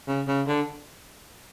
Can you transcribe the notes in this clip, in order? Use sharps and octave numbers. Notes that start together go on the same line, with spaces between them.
C#3
C#3
D3